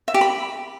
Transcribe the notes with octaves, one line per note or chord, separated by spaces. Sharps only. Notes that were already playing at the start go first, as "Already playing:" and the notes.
E5
G4
B5